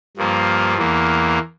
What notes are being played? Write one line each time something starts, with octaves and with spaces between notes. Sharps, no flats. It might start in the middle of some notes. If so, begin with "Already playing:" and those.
G2 F3 A#3
E2 E3 A#3